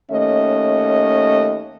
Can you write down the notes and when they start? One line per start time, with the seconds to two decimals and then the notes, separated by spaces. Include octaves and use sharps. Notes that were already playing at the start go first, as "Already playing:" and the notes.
0.10 D#2 A3 C#4 D#5